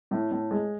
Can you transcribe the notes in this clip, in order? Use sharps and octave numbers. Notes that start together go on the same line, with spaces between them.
A2
A2
G#3